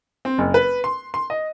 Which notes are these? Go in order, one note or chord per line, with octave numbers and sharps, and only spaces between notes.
C4
F#1
B4
C6
C6
D#5